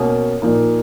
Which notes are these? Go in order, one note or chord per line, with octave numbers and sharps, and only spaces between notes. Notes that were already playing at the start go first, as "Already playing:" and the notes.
Already playing: B2 A#3 C#4 D#6
A#2 F3 A#3 D#4